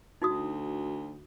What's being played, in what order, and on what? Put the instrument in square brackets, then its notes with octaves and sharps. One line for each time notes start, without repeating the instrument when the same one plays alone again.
[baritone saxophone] D2 [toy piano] D#4 F#4 D#6